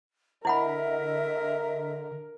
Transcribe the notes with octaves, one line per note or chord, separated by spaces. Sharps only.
D3 E4 A#4 D#5 E5 F#5 B5